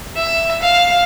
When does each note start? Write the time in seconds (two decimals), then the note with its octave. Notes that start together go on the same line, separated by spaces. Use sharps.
0.16 E5
0.62 F5